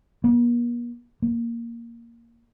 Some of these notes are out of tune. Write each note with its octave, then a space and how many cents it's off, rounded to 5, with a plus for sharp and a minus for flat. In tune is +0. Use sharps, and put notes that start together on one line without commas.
A#3 +45
A#3 +0